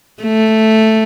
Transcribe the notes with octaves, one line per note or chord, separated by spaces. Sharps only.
A3